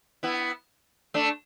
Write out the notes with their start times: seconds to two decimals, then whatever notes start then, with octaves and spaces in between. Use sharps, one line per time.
0.23 B3 E4
1.14 A3 D4